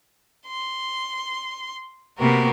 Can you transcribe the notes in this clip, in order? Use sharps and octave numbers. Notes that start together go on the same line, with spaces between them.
C6
C3 A#3 B3 F#4 G4 A#4